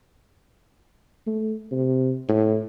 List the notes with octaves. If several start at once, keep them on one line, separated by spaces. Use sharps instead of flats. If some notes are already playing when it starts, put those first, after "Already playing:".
A3
C3
A2